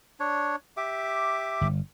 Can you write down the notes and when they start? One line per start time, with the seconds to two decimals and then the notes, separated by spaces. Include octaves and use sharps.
0.20 D4 C#5
0.77 G4 E5 D6
1.61 G1